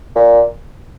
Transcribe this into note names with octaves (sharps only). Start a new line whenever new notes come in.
A#2